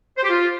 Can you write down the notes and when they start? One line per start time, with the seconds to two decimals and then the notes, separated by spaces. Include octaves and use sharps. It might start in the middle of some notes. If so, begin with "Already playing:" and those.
0.17 C5
0.23 G4
0.30 F4